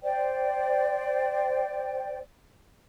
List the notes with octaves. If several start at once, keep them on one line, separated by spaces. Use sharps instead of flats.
C5 D5 G5